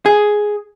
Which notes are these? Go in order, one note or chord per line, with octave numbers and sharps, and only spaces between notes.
G#4